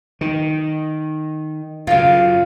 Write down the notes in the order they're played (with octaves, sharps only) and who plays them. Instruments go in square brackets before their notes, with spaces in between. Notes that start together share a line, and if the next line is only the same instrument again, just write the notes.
[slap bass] D#3
[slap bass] F#2 C#3 [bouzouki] F4 F5